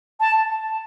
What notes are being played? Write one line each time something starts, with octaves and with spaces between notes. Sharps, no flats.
A5